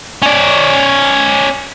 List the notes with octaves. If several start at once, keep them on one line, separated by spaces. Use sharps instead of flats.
C#4 D5